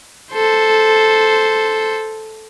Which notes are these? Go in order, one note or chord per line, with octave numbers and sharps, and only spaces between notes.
A4 C5